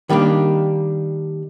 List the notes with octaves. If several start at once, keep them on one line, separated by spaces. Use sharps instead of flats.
D#3 G3 A#3 C#4 D4